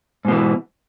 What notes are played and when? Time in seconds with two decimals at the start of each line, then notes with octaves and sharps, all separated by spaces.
0.25 G#2
0.28 B2
0.32 E3